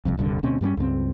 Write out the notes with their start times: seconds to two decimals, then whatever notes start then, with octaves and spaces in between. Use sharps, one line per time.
0.05 E1 C2 F2
0.17 D#1 C2 G2 D3
0.43 D2 B2 C4 C#4
0.61 G2 G3 A3 C#4
0.77 C#2 G2 A3 C4